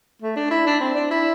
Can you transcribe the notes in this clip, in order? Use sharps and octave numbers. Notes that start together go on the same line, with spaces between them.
A3
D4
E4
D4
C4
D4
E4